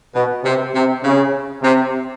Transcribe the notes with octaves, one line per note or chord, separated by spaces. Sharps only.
B2
C3
C3
C#3
C3